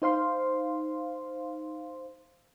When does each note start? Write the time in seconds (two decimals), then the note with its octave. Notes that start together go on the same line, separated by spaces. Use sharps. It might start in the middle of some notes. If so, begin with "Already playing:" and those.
0.02 D#4 C5 F5 C6